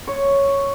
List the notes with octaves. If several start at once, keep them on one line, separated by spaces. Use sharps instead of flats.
C#5